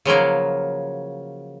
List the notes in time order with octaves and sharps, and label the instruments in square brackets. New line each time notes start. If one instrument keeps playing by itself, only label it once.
[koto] C#3 F3 F#3 A#3